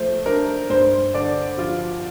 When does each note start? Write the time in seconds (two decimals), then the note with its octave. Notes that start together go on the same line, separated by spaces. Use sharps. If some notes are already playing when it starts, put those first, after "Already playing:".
Already playing: F3 A3 C5
0.25 D4 A#4
0.70 G2 C5
1.14 D3 D5
1.57 F3 F4